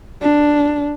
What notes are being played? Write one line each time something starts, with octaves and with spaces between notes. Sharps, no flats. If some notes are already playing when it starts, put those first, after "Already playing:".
D4